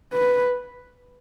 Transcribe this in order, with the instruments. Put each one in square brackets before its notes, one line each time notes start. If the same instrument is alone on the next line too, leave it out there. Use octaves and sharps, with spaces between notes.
[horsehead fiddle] B4